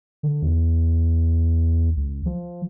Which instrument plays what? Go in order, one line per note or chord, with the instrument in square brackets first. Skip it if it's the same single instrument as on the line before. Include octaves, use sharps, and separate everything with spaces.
[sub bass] D3
E2
C#2
F3